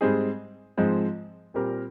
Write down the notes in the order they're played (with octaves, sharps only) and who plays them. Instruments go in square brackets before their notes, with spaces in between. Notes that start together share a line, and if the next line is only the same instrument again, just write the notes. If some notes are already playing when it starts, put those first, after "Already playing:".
[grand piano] G#2 G3 C4 D#4 G#4
G#2 F3 G#3 C4 D#4
A#2 G3 C4 G4 A#4